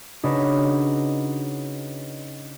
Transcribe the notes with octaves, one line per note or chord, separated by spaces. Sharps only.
C#3 D4 D#4 F#4 B4